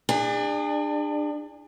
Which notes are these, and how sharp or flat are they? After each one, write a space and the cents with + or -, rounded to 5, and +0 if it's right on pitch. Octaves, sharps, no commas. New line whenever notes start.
D4 +25 G#4 -35